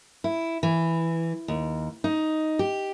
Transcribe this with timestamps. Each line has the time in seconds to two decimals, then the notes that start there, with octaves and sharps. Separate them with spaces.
0.24 E4
0.63 E3
1.48 D#2
2.04 D#4
2.59 G4